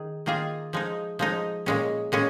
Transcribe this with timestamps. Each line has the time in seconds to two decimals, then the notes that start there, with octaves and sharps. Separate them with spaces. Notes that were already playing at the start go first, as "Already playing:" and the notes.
Already playing: D#3 G#4
0.26 D#3 A#3 F4 G#4
0.73 F3 G#3 D#4
1.19 F3 G#3 D#4
1.66 A#2 G#3 C#4
2.12 A#2 G#3 C#4